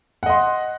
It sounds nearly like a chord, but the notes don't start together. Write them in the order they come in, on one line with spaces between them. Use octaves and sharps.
F#5 D#5 C6